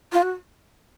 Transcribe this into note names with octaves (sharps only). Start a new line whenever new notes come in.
F4
F#4